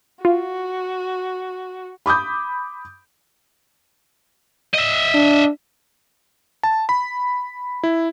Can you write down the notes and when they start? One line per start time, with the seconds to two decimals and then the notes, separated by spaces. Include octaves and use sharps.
0.25 F4 F#4
2.06 B5 D6 D#6 G6
4.74 D#5 E5
5.14 D4
6.63 A5
6.89 B5
7.83 E4